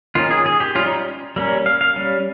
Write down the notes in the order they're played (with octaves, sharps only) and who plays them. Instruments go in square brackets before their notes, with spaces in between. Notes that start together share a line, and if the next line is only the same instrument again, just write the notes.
[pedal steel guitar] D#3 A#3 C#4 F4
G#4
G#4
G4
C#4 F4
G3
D#4
G3 A#3 C#4
F5
F5
G3 C#4